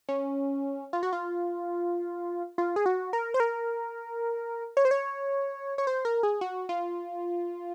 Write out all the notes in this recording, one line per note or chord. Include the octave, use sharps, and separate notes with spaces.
C#4
F4
F#4
F4
F4
G#4
F#4
A#4
C5
A#4
C#5
C5
C#5
C#5
C5
A#4
G#4
F#4
F4